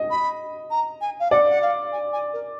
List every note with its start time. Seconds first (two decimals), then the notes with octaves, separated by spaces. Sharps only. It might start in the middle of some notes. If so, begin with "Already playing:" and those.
Already playing: D#5
0.10 B5
0.70 A#5
1.01 G#5
1.19 F5
1.31 D5 F#5
1.50 F#5
1.62 F5
1.92 G#5
2.13 G#5
2.33 A#4